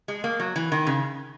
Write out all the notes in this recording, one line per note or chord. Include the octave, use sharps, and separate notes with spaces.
G#3
A#3
F#3
E3
D#3
C#3